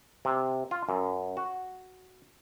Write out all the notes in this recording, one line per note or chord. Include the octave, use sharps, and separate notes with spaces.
C3
F4
F#2
F#4